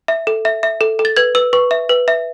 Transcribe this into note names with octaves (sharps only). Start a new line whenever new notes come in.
E5
A4
E5
E5
A4
A4
A6
B4 G#6
B4 E6
B4 C#6
E5
B4
E5